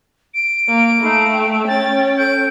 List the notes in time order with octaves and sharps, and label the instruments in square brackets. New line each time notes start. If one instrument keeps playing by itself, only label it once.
[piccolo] D7
[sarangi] A#3
[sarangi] A3 [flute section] D#4 F5 B5
[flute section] G5
[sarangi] C#4 [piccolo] A6
[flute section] A4 G6 [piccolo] D7